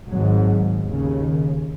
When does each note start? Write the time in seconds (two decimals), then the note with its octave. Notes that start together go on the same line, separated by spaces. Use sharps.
0.09 G#1 G#2 F#3
0.82 D#2 C#3
1.20 D#3